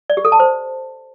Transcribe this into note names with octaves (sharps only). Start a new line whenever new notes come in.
D5
G4
A4
A5
C5